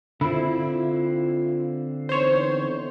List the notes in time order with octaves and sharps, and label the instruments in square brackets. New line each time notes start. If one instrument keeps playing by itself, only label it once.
[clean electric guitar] D3 C4 [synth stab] E4 [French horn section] F4
[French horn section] E3 B3 D#4 [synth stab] C5 C#5